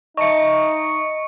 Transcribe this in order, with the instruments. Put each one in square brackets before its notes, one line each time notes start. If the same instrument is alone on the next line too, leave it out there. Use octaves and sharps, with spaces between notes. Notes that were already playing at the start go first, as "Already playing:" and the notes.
[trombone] D#4 [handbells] D#5 [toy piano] E5 A5 A#5 [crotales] C#6 C#7